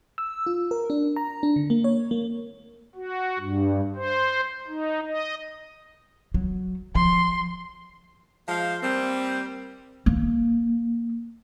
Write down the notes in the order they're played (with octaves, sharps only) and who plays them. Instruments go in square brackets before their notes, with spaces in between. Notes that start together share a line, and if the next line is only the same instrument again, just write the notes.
[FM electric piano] E6
F4
A#4
D4
A#5
D4
D3
A#3
C#5
A#3
[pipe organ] F#4
G2
C5
D#4
D#5
[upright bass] F#3
[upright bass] F3 [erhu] C6
[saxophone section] F3 G#3 C5 F5
G3 A#3 C4
[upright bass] A#3